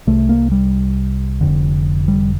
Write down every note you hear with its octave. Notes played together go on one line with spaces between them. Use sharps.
C2 C3 A3
A#3
G3
F1 F2 D3
G3